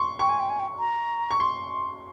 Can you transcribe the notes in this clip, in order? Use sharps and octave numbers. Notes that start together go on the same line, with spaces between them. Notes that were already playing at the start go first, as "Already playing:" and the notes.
Already playing: C6 C#6
G5 C#6
G#5
G5
G#5
G5
A#5
C#6
C6